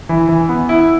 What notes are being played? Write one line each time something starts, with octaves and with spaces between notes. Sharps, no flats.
E3
E3
B3
E4